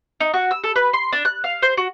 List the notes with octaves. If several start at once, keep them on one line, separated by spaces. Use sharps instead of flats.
D#4
F#4
E6
A4
B4
C6
D4
F#6
F5
C5
F#4